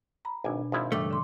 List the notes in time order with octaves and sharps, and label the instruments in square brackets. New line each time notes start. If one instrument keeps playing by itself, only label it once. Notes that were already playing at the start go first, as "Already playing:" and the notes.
[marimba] A#5 B5
[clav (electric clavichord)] G#1 G#5 [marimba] B2 D4
[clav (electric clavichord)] G#1 F3 E4
[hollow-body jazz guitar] G2 A3 [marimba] C#3 E3 D6
[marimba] D3 C6 D6